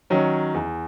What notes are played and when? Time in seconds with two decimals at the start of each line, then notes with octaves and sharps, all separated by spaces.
0.10 D#3 F#3 C#4
0.54 E2